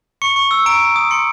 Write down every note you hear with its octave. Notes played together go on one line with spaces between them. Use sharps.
C#6 C#7
C#6
E6
A#5 D7
A#5
D#6
C6 C#7